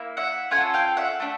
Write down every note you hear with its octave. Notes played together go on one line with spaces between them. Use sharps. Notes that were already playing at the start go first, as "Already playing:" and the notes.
Already playing: A#3 E4
E5 F#5
C#4 F4 A4 F#5 G#5
F5 G5
E5 F#5
A3 D4